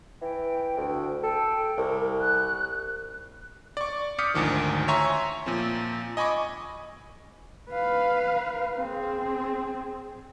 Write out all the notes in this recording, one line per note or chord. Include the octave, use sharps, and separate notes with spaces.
E3 G5
D2
A4 G5
C2 A#4
F#6
D5 C#6
D6 D#6 F6 G6 B6 C#7
G#1 D2 D#3 F3
C#5 E5 G#5 A#5 C6 C#6
A#2 F3 C4
D#5 G#5 B5 C#6 D6
B4 F5
C4 G#4